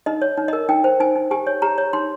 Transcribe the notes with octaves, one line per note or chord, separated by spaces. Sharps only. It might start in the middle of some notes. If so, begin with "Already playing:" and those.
D#4 D#5
C#5
D#4
D#5
A#4
D#4 G5
C5
D#4 G#5
D#4
G4 G#5
C#5
G4 A#5
C#5
D#4 C6